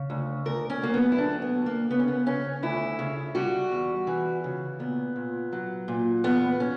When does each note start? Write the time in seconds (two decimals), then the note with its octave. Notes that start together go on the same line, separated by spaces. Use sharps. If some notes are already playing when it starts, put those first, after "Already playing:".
Already playing: C#3
0.10 D2
0.45 D2 A#4
0.70 C#4
0.82 F#3 A#3
0.94 B3
1.12 E4
1.18 D2 D4
1.42 B3
1.54 D2
1.66 A#3
1.90 C#3 B3
1.99 C#4
2.08 B3
2.26 C#3 C#4
2.63 D2 E4
2.99 C#3
3.35 G3 F#4
3.71 E2
4.07 E3
4.44 C#3
4.79 A#2 B3
5.16 A#2
5.52 F#3
5.88 A#2
6.24 E2 B3
6.60 C#4